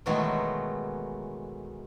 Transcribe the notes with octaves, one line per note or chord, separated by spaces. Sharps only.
B2 D#3 E3 F#3 G#3 A3